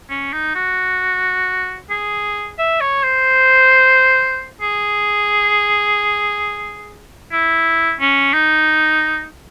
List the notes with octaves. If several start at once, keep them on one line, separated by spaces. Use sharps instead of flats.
C#4
D#4
F#4
G#4
E5
C#5
C5
G#4
E4
C#4
D#4